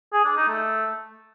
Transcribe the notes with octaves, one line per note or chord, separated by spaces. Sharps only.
G#4
D4
D#4
A3